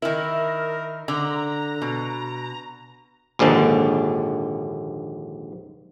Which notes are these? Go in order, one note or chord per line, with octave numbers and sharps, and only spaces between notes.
D#3 E4 A#4
D3 A#5
B2
A#1 D#2 G#2 D3 A5